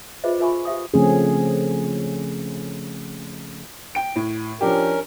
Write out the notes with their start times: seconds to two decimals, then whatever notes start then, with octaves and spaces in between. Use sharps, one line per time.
0.24 F4 G#4 B4 C5 D#5 E5
0.40 F4 A#4 E5 G#5 B5 C#6
0.65 G4 C5 E5 F5 D#6
0.94 C#3 F3 A3 C4 C#4 G#4
3.95 G5 D7
4.16 A2
4.61 F3 C#4 D4 G4 A#4